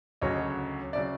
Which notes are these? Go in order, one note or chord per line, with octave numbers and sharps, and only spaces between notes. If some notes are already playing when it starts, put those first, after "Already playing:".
D2 C#3 F#3 C#5 D#5
D5 E5
C#3 F#3